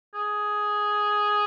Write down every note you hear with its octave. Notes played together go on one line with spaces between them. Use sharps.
G#4